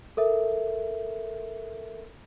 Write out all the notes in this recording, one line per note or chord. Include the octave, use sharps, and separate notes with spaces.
A4 A#4 E5